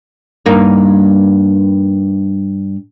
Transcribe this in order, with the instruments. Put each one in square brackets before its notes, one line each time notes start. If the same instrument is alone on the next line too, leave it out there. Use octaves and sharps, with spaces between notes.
[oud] G2 A#3 D#4